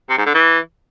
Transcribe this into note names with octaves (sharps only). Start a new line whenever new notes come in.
C3
G#2
D3
E3